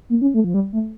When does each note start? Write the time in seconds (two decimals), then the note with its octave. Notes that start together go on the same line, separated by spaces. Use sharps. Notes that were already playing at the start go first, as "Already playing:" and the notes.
0.10 A#3
0.21 C#4
0.34 A3
0.44 F3
0.54 G3
0.73 A3